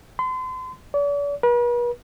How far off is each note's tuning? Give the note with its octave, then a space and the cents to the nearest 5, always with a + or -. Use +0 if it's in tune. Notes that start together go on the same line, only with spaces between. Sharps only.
C6 -40
D5 -45
B4 -45